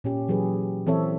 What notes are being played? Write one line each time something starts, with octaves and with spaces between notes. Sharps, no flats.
A#2 C#4 G4
E3 F#3 G4 G#4 B4
E3 C4 A4 C#5 E5